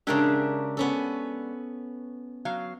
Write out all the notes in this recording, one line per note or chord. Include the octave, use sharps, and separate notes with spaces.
C#3 G#3 D4 G4 A#4 E5
B3 C#4 A4
F#3 F5